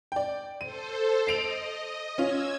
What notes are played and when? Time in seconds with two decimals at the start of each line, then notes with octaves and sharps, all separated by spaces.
0.12 D5 G5
0.61 A4 C5 D#7
1.27 D#5 C7 D7 F7
2.18 C#4 F4 E6 G#6